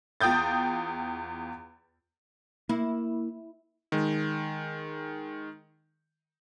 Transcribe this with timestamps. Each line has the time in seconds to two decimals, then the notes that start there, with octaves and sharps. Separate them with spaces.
0.21 E2 F4 G5 D#6 G6 A6
2.69 A#3 E4
3.92 D#3 G#3